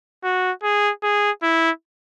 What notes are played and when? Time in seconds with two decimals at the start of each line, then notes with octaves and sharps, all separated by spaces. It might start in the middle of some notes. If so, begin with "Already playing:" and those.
0.24 F#4
0.63 G#4
1.03 G#4
1.43 E4